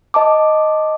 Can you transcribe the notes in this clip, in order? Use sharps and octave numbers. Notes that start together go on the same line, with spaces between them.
D#5 A5 D6